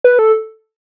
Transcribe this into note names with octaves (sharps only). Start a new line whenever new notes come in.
B4
A4